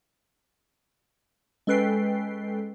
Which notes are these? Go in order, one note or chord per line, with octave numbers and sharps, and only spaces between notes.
G#3 C#4 A4 B4 G5 C7